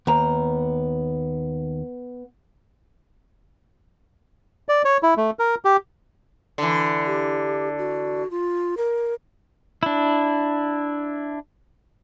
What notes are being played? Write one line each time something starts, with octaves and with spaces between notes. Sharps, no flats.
D#2 B3 A#5
D5
C#5
E4
A3
A#4
G4
D3 E3
G4
F#4
F4
A#4
D4 E4